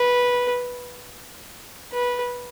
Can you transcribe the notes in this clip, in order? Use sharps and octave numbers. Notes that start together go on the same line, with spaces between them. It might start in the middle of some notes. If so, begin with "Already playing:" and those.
Already playing: B4
B4